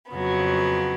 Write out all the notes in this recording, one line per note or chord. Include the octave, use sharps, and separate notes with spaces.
F2 C#3 F#3 B3